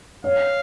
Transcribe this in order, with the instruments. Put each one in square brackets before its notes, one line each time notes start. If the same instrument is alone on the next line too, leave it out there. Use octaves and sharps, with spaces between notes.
[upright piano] C#5 [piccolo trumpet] F5